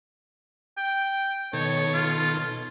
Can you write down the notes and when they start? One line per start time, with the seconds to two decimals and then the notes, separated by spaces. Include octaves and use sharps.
0.77 G5
1.53 B2 D#3 A4 C#5
1.94 F4